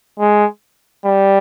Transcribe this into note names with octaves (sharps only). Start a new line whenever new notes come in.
G#3
G3